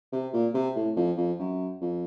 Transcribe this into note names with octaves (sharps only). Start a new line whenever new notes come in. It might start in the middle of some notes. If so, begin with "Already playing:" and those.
C3
A#2
C3
A2
F2
F2
F#2
F2